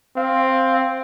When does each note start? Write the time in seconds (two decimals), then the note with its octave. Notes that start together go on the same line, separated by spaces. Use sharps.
0.17 C4 F5